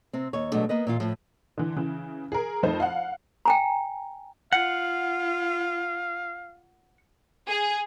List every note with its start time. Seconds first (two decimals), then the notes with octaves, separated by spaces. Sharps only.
0.13 C3 C4
0.33 D#2 C#5
0.52 B2 F#3 G#3 A3 D4
0.69 A#3 B3 B4 D#5
0.87 A#2 E3 F4
1.00 A2 F3
1.58 D3 E3
1.76 C#3 E3
2.32 G#4 A#4
2.63 F2 A3 D#4 C5
2.80 F5 F#5
3.45 G5 G#5 A#5
4.53 F4 F5 F#5
7.48 G#4